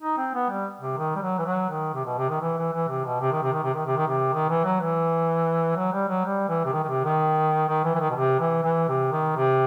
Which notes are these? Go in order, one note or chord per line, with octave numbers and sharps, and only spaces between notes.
D#4
C4
B3
G3
C3
D#3
G3
F#3
E3
F#3
D#3
C3
B2
C3
D#3
E3
E3
E3
C3
B2
C3
D#3
C3
D#3
C3
D#3
C3
D#3
C3
D#3
E3
F#3
E3
F#3
G3
F#3
G3
E3
C3
D#3
D#3
C3
D#3
D#3
E3
E3
D#3
B2
C3
E3
E3
C3
D#3
C3